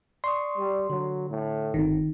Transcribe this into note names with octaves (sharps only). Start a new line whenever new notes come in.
D5 C6 C#6 D#6
G3
D3 F#3
A2
G1 D#3 C4